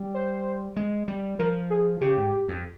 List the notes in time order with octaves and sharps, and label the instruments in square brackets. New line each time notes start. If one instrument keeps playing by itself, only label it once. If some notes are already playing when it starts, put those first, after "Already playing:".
Already playing: [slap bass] G3
[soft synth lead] C5
[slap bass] G#3
G3
[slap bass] F3 [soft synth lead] A#4
[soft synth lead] G#4
[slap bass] C#3 [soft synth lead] G4
[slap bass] G#2
F2